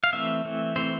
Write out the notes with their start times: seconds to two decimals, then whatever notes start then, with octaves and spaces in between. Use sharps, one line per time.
0.04 F5
0.13 E3 A3 C4 E5
0.45 E3 A3 C4
0.76 E3 A3 C4 C5